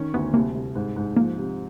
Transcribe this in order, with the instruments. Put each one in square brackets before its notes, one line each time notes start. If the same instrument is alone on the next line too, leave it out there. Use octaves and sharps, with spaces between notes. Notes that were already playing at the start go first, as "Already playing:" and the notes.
Already playing: [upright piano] D#3 C#4
[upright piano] D2 [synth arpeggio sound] B3
[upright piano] C2 [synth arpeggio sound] A#3
[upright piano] C2
G#2
G#2
[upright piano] F3 [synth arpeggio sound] A#3
[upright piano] C3